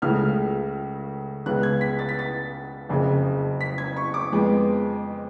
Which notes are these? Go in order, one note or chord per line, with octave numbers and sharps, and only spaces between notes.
C#2 C#3 F3 A3 F6
C#2 C#3 G#3 B3 F#6
G#6
B6
A6
B6
A6
F#1 F2 C#3
B6
G#6
C#6
D6
F2 F3 G#3 B3